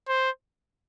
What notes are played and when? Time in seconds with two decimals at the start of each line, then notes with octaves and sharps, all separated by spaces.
0.08 C5